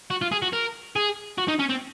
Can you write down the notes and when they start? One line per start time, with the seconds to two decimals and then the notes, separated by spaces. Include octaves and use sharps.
0.10 F#4
0.22 F4
0.32 G#4
0.42 F#4
0.53 A#4
0.96 G#4
1.38 F#4
1.48 D#4
1.59 C#4
1.70 C4